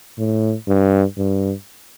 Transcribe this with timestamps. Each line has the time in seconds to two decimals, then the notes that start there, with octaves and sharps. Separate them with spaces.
0.19 A2
0.68 G2
1.17 G2